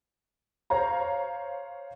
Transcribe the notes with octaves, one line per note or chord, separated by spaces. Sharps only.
C5 C#5 F5 A#5